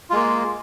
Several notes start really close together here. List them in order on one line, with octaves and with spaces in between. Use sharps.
F4 G#3 A#3